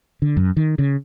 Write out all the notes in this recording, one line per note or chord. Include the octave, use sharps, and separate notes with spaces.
D3
F#2
D#3
C#3